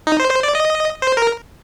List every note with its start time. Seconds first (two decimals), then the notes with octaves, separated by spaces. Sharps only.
0.07 D#4
0.20 C5
0.30 C5
0.43 D5
0.55 D#5
1.02 C5
1.17 A#4